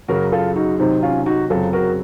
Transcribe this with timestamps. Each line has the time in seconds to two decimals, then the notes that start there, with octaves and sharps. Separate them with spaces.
0.08 F#2 C#3 F#3 F#4 A#4
0.32 F4 A4
0.56 D#4 F#4
0.79 C3 D#3 F#3 C4 D#4
1.03 C#4 F4
1.26 D#4 F#4
1.50 F#2 C#3 F#3 C4 F4 A4
1.73 F#4 A#4